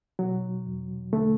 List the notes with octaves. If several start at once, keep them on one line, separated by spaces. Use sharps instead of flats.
B2 F#3
E2
D3 A3